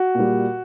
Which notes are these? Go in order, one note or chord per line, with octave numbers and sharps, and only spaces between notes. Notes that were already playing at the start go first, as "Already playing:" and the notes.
Already playing: F#4
A#2 G3